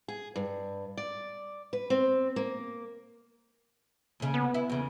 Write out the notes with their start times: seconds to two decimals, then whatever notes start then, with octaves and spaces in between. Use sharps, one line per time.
0.08 G#4
0.36 G2
0.97 D5
1.73 B4
1.90 C4
2.36 A#3
4.20 D#2 C#3
4.34 B3
4.54 E4
4.70 E2 C#3